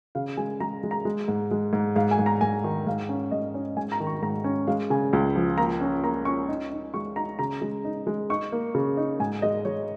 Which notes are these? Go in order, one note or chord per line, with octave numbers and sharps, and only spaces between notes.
C#3 F5
G#3 G#5
G#3 A#5
G#3
A#5
G#3
G#2
G#3
G#2
G#2 F5
G#5
G#2
A#5
G#2 G#5
D#3
G#2 F5
C#4
G#2 D#5
C#4 C#5
G#2 G#5
A#5
D#3
C#6
G#2 A#5
C#4
G#3 F5
C#3 G#5
C#2
F3
A#3 A#5
C#4
A#3 A#5
C#4 C#6
D#4
D#4
G#3 C#6
D#4 A#5
C#3 A#5
G#3
D#4
G#3
D#4 C#6
A#3
C#3
D#4
G#2 G#5
G#3 D#5
G#3 C#5